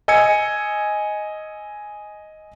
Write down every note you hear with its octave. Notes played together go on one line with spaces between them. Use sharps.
D#5 G#5 E6 G#6 C#7